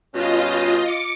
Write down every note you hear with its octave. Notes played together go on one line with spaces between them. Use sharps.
G2 B2 C#4 F4 D#5
D6 C#7